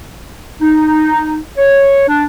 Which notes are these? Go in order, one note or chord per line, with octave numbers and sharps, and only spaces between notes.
D#4
C#5
D4